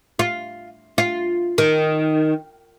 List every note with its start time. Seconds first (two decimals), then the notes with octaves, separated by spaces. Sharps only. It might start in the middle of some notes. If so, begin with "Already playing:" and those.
0.19 F4
0.98 F4
1.58 D#3